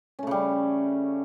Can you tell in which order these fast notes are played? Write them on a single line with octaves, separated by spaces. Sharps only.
C#4 A3 C#3 G3